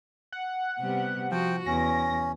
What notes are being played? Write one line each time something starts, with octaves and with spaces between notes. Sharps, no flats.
F#5
C3 G3 B3
F3 F#4 G5
E2 C#4 A#6